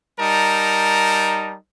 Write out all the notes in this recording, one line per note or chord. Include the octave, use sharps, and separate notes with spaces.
G3 D#4 A#4 A5